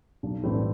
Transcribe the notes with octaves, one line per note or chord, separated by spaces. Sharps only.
B1
A2 E3 G3 C4